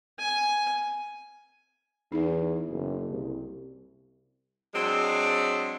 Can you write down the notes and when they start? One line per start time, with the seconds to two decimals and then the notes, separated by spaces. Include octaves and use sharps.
0.19 G#5
2.12 E2 D#4 E4
2.70 F#1
3.10 C2
4.74 F#3 G#3 C4 D4